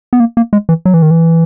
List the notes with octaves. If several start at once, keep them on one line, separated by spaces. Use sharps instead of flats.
B3
A#3
A#3
G#3
E3
F#3
E3
D#3
E3